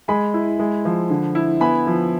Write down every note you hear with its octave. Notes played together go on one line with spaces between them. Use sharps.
G#3 G#5 B5
E4
G#3
F3
D3
E4
B3 G#5 B5
F3